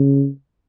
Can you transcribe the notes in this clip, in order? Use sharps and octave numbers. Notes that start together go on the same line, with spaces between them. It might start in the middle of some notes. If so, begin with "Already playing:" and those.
Already playing: C#3